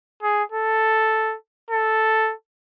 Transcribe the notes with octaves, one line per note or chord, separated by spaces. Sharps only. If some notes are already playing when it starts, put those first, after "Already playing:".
G#4
A4
A4